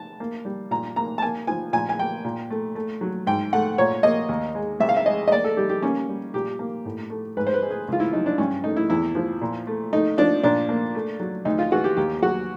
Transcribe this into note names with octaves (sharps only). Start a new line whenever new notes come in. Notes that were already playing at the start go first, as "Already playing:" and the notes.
Already playing: A5
A#3
G3
A#2 A#5
A#3 A#5
A5
A#3 G#5
F3 G#5
A#2 G#5
G#5
A#3 G5
A#2
A3
A3
F#3
G#2 G5
A3 F#5
A#2 C#5
A#3 D#5
D#2
G#3
C2 E5
F5
E5
G#3 D#5
D#5
A#3 D5
A4
G3 G4
G4
A#3 C#4
G3
A#2 G4
A#3
A2
A3
G#2 B4
C5
B4
G#3
G#4
C#2 F4
E4
F#3 D#4
D4
G2 C#4
A3 D#4
E4
E2 E4
F3
A#2
A3
A3 D#4
F3 D4
A#2 D4
A#3
A3
F#3
D2 D#4
F4
E3 F#4
G4
D#2 G4
F#3 F#4